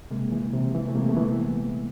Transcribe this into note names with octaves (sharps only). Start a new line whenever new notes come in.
C3 G#3 A#3
E3
C3
E3
A3
C3 G#3 A#3
A3 B3
E3